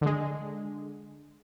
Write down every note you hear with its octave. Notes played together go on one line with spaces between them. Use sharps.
D3 G#3